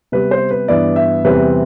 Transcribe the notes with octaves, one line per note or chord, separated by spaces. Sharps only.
C3 G3 B3 B4
C5
B4
G2 E3 B3 E4 D5
E5
E2 C3 E3 G3 C4 B4